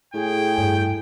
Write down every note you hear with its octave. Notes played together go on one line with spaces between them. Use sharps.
A2 G#4 G5
G2